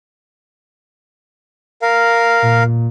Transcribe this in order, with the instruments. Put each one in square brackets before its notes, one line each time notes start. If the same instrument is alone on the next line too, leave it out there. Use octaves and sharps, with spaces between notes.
[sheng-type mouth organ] A#4 F5
[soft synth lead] A#2